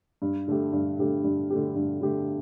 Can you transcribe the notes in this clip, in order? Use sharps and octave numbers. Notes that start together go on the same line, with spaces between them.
G2
D3 A3 G4
G2
D3 A3 G4
G2
D3 A3 G4
G2
D3 A3 G4